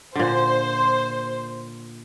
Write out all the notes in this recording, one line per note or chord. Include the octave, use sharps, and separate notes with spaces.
A#2 D3 C5